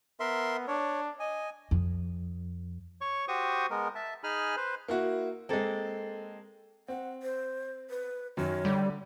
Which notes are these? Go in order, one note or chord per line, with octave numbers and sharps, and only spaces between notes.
B3 A#4 E5 C6
D4 C#5
D#5 G#5
F2
C#5 C#6
F#4 G4 C5 C#6 D#6
G#3 B3 A#4
E5 A5
D#4 G#4 G#5 B5 F6
B4 C5
A#3 E4 F#4
G#3 A#3 C4 A4
C4 F#5
C5
B4
F#2 D#3 F#3 C#5
D3 G3